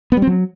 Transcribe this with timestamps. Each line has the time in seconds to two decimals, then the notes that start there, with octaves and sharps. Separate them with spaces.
0.12 B3
0.17 G3
0.22 C4
0.27 F#3